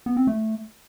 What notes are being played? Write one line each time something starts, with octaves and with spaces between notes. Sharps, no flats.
B3
C4
A3